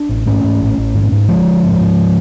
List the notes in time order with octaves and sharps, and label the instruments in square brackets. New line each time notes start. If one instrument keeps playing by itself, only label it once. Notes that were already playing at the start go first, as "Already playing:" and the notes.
Already playing: [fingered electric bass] D4
A1
G#2 A3 C#4
G#2
A1
A1
G#2
G#2
A1 F3 G#3
A1
G#2
G#2